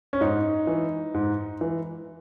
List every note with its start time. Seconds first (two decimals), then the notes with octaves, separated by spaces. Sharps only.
0.13 C#4
0.21 G#2 D#4
0.67 E3
1.14 G#2
1.61 E3